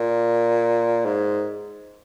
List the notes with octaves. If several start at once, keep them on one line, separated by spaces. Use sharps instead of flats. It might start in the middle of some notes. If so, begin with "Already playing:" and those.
Already playing: A#2
G#2